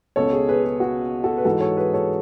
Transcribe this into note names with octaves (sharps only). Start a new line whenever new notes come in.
C#2 B2 A4 C#5
G#4
G#4 B4
G#4
F#4
F#4 A4
B4
G#2 E3 F#4 A4
A4 C#5
G#4 B4
A4 C#5